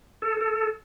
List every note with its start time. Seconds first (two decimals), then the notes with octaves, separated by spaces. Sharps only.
0.22 A4
0.41 A4